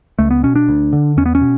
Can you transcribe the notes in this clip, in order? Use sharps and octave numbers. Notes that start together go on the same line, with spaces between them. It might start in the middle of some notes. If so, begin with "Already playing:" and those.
C#2 A3
B3
B2 C#4
D4
D2
D3
E2 C#4
B3
C#4
B2